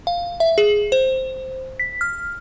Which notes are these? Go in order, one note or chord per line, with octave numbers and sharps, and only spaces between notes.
F5
E5
G#4
C5
B6
F6